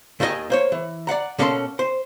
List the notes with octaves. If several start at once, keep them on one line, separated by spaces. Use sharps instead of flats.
D#2 D#3 D#4 F4 D#5 G#5
A#3 C5 C#5
E3
D5 F5 F#5 A#5
B2 A#3 C#4 A4 D5 C6
C5